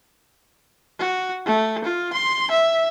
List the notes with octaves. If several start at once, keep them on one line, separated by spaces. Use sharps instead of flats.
F#4
A3
F4
C6
E5